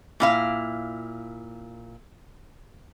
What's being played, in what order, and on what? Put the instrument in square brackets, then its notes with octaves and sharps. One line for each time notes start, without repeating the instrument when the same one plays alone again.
[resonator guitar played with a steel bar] A#2 E4 F5